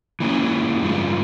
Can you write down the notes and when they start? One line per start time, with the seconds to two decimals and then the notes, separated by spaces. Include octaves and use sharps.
0.20 E3 A#3 C#4
0.82 G2 F3 G#3